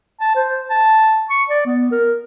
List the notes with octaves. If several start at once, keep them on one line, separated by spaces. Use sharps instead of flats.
A5
C5
A5
C#6
D5
B3
A#4